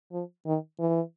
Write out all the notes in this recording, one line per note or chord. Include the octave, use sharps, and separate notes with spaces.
F3
D#3
E3